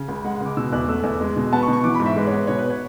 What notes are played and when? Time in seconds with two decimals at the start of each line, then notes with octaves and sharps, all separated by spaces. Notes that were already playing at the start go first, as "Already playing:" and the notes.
Already playing: C#3
0.08 C#2
0.24 G#3 F#5
0.35 F#5
0.41 C#2 D6
0.57 B2 E6
0.73 E2 F#6
0.88 A3 E6
1.04 E2
1.21 G#3
1.36 B2
1.53 B3 A5
1.63 C#6
1.68 B2
1.73 C#6
1.83 E3 D6
1.95 B5
2.00 G#2
2.06 E5
2.16 G#3 B4
2.27 C#5
2.32 B3 B4
2.47 B2 C#5
2.59 B4
2.70 C#5